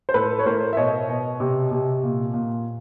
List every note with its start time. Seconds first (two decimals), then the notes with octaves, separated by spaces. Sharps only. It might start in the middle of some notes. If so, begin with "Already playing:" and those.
0.09 C5
0.14 A2 A4 B4
0.39 C#5
0.46 A2 A#4 C5
0.73 E5
0.77 B2 C#5 D#5
1.09 B2
1.40 C3
1.71 C3
2.03 A#2
2.34 A#2